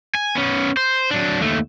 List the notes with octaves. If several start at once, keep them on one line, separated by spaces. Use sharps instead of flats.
G#5
B3 C#4
C5
F#3 D4
D#2 A3